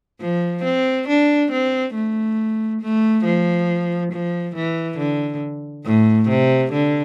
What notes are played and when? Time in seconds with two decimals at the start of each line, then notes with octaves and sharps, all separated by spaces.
0.20 F3
0.64 C4
1.08 D4
1.52 C4
1.95 A3
2.81 A3
3.25 F3
4.12 F3
4.55 E3
4.98 D3
5.85 A2
6.29 C3
6.73 D3